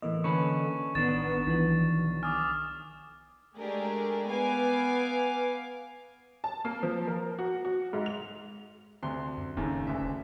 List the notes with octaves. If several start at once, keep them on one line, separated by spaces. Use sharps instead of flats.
A2 E3 A#3 D#5
D3 C#4 A4 B4 C#6
A1 D#3 B3 D4 A6 E7
B1 E3 F3 B3
G#5 D6 D#6 F6
G#3 A3 D4 G4 G#4 A#4
B3 B4 F5 G#5 D6
A5
A#3
F3
A#4
F#4
F#4
G#2
F7
D2 C3 C6
F#2
F1 D#2 A2 C#3
D2 C#3 E5